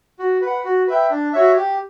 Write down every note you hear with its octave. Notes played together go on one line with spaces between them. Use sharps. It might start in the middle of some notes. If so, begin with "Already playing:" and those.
F#4
B4
F#5
F#4
B4 E5 G5
D4
F#4 C#5 E5
G4